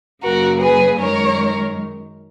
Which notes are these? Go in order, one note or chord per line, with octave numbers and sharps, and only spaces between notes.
F#2 C#3 F#3 A#3 F#4 A#4
G#4 B4
F#2 D#3 G#3 A#4 C#5